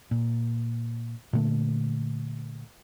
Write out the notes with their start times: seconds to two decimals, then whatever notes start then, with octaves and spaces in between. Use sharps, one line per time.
0.11 A#2
1.33 A#2 D3 A3